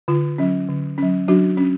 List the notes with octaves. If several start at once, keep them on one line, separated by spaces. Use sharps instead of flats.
D3 F4
F#3 C#4
D3
F#3 C#4
F#3 D4 F#4
C#4